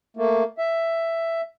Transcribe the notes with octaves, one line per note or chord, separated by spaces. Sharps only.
A3 A#3
E5